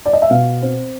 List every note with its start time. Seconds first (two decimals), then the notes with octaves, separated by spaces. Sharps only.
0.06 D5
0.13 D#5
0.22 E5
0.30 B2 F5
0.62 C4